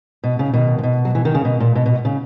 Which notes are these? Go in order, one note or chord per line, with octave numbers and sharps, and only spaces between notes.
B2
C#3
B2 D#3
A#2
B2
F#3
E3
D#3
C#3
B2
A#2
B2
B2
C#3